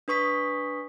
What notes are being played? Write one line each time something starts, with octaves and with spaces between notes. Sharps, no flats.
D4 B4 C#6 D#6 B6